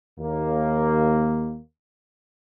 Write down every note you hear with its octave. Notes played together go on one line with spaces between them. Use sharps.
D#2 A#3